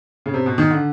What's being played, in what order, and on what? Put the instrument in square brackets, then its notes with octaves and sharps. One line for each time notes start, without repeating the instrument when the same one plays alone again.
[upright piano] C#3
C3
B2
D#3
D3